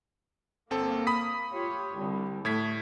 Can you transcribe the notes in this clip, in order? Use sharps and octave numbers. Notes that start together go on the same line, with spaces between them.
G1 A#3 C4 A4
B5 D#6 B6
F4 G4 C#5
C2 D3 G3
A2 A3 G#6 B6